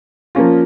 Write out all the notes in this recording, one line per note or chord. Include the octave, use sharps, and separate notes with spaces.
F3 A#3 C#4 F4